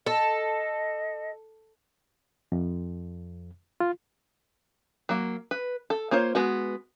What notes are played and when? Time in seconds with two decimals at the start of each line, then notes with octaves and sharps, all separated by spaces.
0.06 A4 D#5
2.52 F2
3.80 F4
5.09 F#3 A#3
5.51 B4
5.90 A4
6.11 A#3 F4 C5 C#5
6.35 G#3 B3 F#4